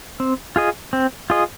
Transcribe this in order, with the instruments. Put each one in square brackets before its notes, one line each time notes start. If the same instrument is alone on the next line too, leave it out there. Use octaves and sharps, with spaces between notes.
[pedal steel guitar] C4
F4 G#4 D#5
C4
F4 G#4 D#5